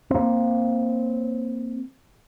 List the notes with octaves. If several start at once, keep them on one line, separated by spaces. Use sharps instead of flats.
A#3 C4